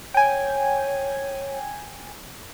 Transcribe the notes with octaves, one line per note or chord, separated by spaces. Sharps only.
C#5 G5 G#5